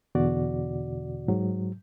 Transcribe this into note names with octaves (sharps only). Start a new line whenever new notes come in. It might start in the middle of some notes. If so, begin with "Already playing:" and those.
E2 B2 D3 F#4 D5
G#2 F#3